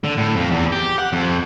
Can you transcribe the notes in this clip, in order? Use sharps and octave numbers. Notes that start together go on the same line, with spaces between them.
D3
A2
F2
E2
G4
F#5
F2